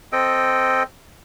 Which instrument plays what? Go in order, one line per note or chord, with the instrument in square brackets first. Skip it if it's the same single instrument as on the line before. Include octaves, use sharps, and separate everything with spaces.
[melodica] C4 A4 D#5 G5